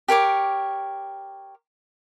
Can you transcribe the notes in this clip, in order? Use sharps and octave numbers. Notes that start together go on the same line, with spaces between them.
G4 A#4 C#5 D6